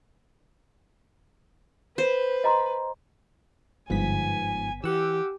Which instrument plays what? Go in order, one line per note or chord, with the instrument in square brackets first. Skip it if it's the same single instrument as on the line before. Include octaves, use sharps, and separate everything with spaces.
[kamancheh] B4 [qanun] C5
[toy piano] D#5 A#5 C6
[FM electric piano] G1 B3 B6 [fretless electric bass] G#2 F3 [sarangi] G#5
[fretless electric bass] E3 [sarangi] G4 [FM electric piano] F#5 E6